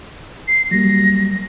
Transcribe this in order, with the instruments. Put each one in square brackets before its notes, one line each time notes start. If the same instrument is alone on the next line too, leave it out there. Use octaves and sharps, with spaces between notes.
[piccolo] C7
[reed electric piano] F#3 G3 A#3 [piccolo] A#6